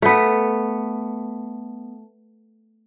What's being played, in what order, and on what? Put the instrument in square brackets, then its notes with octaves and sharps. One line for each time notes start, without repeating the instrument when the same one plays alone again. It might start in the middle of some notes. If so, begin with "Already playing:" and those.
[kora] A3 B3